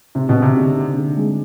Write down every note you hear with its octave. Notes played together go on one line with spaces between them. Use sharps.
C3 C4
B2
D3
C3
D3
C4
D3
G#3